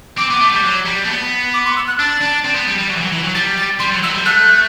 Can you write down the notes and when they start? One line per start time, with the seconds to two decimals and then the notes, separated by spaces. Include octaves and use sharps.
0.18 C4 D6
0.30 B3
0.41 A3
0.53 G3
0.63 F#3
0.86 G3
1.05 A3
1.09 B3
1.54 D6
1.65 C6
1.76 E6
1.87 F#6
1.99 D4 A6
2.22 D4
2.45 C4
2.56 B3
2.68 G3
2.78 G3
2.90 F#3
2.96 E3
3.01 F#3
3.12 E3
3.23 F#3
3.35 G3 A6
3.57 A6
3.79 G3 C6
3.92 F#3
4.03 F#3 E6
4.09 A3
4.14 G3
4.25 A3 F#6